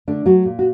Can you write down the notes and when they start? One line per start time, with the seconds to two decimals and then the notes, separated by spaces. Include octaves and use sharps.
0.08 D3 A3 D4
0.26 F#3 F#4
0.45 A#2
0.59 F#4